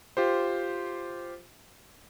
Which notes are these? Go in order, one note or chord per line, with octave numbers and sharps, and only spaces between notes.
F4 G4 C5